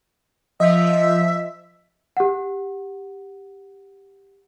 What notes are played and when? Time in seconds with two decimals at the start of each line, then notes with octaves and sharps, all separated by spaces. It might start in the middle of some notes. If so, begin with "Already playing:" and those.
0.60 F3 D#5 E5
2.17 G4 F#5